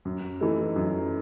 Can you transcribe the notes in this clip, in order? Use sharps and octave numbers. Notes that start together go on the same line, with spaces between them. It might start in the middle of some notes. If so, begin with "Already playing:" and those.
F#2
E3 A3 D#4
F#2